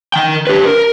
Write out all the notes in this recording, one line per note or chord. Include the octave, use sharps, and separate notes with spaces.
D#3 G5
G4 B4
A#4